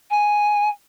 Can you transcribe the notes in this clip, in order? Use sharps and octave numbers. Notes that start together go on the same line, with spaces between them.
G#5